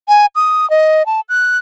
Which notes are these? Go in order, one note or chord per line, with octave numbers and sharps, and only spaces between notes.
G#5
D#6
D#5
A5
F#6